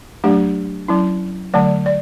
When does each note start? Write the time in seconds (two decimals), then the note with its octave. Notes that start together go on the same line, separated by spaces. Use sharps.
0.24 F#3 A3 D4 G4
0.88 F#3 C#4 E4
1.54 D3 F#3 A3 D5
1.86 D5